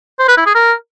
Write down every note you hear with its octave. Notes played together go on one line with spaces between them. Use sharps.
C5
B4
E4
G#4
A#4